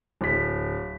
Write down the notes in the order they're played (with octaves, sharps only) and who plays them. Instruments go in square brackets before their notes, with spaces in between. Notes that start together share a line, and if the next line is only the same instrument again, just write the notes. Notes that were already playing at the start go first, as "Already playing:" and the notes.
[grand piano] D1 B6